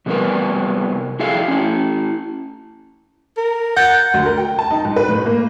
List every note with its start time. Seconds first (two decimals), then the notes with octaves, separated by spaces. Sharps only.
0.06 C3 G3 B3 D#4 A#4 B4
1.20 E4 G#4 A4 E5 F5
1.48 C#4 E4
3.37 A#4
3.76 F#5 G6 A6 A#6
4.14 D2
4.26 A#4
4.38 G5
4.59 A5
4.71 D#4
4.85 G#2
4.96 B4
5.09 A2
5.26 A#3